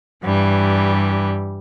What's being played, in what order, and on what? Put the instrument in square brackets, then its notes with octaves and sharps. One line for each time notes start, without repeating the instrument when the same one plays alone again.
[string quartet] G2 E3 G3